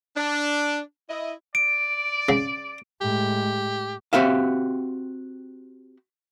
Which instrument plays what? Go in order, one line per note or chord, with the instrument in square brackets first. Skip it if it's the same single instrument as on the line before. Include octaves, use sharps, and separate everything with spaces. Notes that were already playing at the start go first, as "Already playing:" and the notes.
[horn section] D4
E4 D#5
[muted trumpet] D5 [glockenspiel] D7
[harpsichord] C#3
[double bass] A2 G#3 [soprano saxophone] G4
[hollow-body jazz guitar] C4 F#4 G4 E5 F5